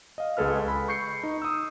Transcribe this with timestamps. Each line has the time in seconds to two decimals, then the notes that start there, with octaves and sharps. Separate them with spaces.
0.18 D#5 F5
0.37 C#2 G#3 G#4 A4 B4 F6
0.68 B5
0.88 C#6 G6 C7 C#7
1.23 D#4
1.42 D#6 E6